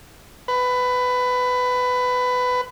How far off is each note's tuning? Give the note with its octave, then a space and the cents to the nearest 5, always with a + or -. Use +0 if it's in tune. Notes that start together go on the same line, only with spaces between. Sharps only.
B4 +15